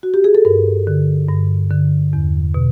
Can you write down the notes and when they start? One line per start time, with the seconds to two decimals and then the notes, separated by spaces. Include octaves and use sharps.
0.03 F#4
0.14 G4
0.24 G#4
0.35 A4
0.45 G2 A#4
0.87 D3
1.28 G2
1.71 D3
2.13 E2
2.54 B2